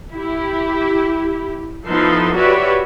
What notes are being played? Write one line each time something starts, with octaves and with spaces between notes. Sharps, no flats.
E4 G4
F3 B3 D#4 E4 A4 C6
F#4 G4 B4 C#5 D5 E5